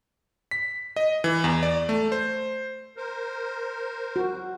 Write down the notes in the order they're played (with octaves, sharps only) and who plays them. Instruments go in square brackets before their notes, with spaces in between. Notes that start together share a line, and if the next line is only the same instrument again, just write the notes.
[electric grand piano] B6
D#5
E3
E2
D5
A3
C5
[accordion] A#4 C5
[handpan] F#4